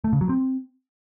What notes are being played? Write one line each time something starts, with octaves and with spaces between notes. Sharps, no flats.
A3
C#3
F#3
C4